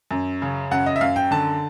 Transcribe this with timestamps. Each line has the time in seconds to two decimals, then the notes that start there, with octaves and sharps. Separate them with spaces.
0.11 F#2
0.42 C#3
0.71 F#2 F#5
0.86 D#5
0.96 E5
1.01 F#2 F5
1.16 G5
1.31 D3 A5